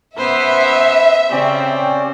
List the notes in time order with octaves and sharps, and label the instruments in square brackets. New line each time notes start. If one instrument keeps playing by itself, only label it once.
[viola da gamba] B3 C#4 C5 [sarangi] B4 [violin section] E5 [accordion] E6
[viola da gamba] C#3 [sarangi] C4 [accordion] C#4 G4 D5